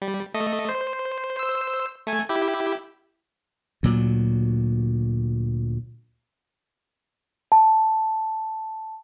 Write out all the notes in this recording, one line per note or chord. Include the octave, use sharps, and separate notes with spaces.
G3
A3 D#5
C5
C5 E6
A3 G#5 G#6
E4 G4
D2 A#2 F#3
A5